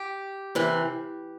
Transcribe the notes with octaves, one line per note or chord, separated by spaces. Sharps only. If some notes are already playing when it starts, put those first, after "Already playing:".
Already playing: G4
C3 E3